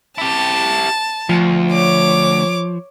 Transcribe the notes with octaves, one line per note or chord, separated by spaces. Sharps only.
E4 G4 A5
D2 F3
C#5 D6